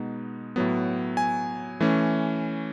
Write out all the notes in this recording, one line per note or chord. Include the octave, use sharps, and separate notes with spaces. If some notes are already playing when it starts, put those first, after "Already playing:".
Already playing: B2 G#3 B3 D#4
A2 F#3 B3
G#5
E3 A3 C#4